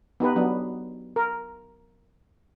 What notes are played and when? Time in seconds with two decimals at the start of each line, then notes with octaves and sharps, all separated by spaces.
0.20 B3 D#4 G4 B4
0.36 F#3 B3 D4
1.16 A#4